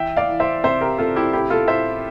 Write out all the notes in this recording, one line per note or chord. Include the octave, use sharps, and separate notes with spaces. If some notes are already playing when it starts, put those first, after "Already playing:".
Already playing: E3 E5 G5
D5 F5
E3
C5 E5
C3 C5 E5
G4 A#4
C3 F4 A4
E4 G4
A2 E4 G4
F4 A4
A2 C5 E5